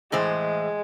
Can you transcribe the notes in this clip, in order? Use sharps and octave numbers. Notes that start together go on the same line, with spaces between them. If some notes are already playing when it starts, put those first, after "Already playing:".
A2 E3 G#3 C5